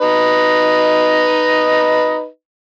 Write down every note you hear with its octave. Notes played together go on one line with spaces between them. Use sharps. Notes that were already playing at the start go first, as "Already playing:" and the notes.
D#4 B4 D#5